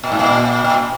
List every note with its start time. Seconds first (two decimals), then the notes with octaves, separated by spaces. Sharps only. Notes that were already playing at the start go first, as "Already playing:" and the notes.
0.04 A#2
0.12 G#2
0.19 A#2
0.64 A#2